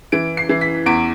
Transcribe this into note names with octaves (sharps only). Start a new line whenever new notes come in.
E3 D7
C7
E3
B6
E2 D7